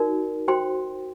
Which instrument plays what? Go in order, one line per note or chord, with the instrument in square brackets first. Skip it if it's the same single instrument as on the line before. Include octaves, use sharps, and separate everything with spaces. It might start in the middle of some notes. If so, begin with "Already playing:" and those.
Already playing: [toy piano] D#4 F#4 A#4 D5
F#4 C5 G5 C6